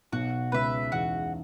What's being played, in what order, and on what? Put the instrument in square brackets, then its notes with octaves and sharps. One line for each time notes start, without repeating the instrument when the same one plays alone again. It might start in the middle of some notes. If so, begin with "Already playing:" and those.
[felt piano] B1 B2 [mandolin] F#4
[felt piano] C#2 C#3 [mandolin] B4 E5
[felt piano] E2 E3 [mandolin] F#4